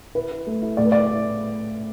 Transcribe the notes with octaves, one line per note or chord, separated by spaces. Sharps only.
E4 B4
E4
A3
E4
A2 D5
B4
A2 D5
E4